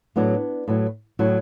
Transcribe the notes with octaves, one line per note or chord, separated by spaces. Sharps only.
A2 F#3 B3 D4
A2 F#3
A2 F#3